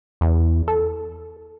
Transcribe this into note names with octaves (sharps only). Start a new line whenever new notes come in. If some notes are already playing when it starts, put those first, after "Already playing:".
E2
A4